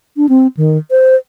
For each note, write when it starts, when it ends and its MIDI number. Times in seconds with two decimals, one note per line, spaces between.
0.17 0.29 62
0.29 0.47 60
0.57 0.78 51
0.91 1.15 72